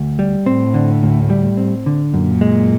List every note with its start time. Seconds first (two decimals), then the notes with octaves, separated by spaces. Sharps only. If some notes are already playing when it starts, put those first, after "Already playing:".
Already playing: D2
0.19 G3
0.46 A2 C4
0.74 D3
1.03 D2
1.30 G3
1.57 C4
1.86 D3
2.14 F#2 A#2
2.41 G#3